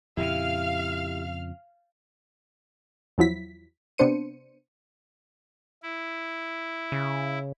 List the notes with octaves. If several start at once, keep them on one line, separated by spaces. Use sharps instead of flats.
F2 A#2 C#3 E4 G4 E5 F5 F6
E2 F3 F#3 E4 B6
C3 B3 D4 C5 C#7 D#7
E4
C#3